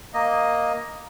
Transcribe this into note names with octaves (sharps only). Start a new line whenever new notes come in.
A#3 D#5